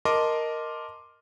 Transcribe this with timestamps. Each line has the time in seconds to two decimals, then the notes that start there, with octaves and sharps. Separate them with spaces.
0.05 A#4 D#5 A5 C6 D6